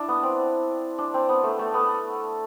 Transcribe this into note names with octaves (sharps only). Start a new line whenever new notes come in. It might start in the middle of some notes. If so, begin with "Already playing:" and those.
Already playing: D4 E4
B3
C4
D4
C4
B3
A3
A3
B3